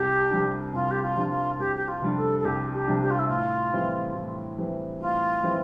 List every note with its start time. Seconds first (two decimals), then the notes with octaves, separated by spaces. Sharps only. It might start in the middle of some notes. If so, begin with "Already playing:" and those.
Already playing: C2 G4
0.31 C3 G3 D4
0.73 C2 F4
0.90 G4
1.02 F4
1.17 C3 G3 D4
1.30 F4
1.59 C2 G4
1.75 G4
1.87 F4
2.02 C3 G3 D4
2.15 A4
2.39 A4
2.44 C2 G4
2.73 G4
2.87 C3 G3 D4
3.01 G4
3.10 F4
3.18 E4
3.27 A2 F4
3.73 E3 G3 C4 E4
4.15 A2
4.58 E3 G3 C4 E4
5.00 A2 F4
5.43 E3 G3 C4 E4